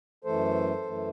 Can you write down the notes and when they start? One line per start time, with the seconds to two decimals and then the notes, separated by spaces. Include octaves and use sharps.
0.24 F#2 E3 A3 A4 C5
0.85 F#2 E3 A3